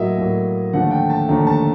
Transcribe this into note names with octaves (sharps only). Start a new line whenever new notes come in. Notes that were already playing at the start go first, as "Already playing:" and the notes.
Already playing: A2 F#3 A#3 D#5 E5
A2 F#3 A#3
D#2 D3 F3 A3 F#5
G5
A5
D#2 D3 F3 A3 A#5
A5